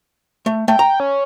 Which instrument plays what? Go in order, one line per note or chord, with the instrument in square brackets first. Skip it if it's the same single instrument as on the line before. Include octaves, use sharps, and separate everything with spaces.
[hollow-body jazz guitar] A3
[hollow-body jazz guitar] A3 [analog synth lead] G5
[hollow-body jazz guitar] A#5
[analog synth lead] C#4